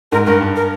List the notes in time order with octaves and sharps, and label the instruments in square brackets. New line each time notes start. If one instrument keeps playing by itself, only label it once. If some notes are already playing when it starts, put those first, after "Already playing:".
[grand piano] G#2 [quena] A#4
[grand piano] G2 [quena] A#4
[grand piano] G2
[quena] A#4